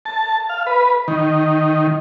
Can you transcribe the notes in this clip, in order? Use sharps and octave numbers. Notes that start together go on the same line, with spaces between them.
A5
F5
B4
D#3